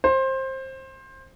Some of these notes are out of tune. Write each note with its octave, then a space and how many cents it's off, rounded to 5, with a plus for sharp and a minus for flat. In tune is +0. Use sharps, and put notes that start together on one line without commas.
C5 +20